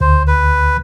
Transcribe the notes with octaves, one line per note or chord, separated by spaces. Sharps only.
D2 C5
B4